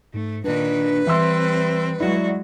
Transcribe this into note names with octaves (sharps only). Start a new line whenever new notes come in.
G#2 A3
A#2 D#3 D4 B4
E3 G3 C4 E5 C6 E6
F#3 G#3 E4 F#4 D5